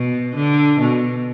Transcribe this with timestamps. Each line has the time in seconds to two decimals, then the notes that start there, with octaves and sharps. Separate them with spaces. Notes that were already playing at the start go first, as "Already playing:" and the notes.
Already playing: B2
0.35 D3
0.80 B2